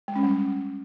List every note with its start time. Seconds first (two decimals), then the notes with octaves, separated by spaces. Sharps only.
0.08 G#3
0.16 C#4
0.23 G3